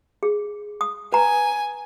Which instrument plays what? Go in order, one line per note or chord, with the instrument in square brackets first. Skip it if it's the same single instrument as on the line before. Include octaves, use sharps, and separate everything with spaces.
[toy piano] G#4
D#6
[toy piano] B4 A#5 [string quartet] G#5